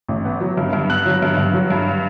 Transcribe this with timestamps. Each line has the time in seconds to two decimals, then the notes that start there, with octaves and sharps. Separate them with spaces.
0.08 A1
0.25 B3
0.41 F#3
0.57 G2
0.73 G2
0.90 B3 F#6
1.06 F#3
1.22 G2
1.37 G2
1.54 F#3
1.70 G2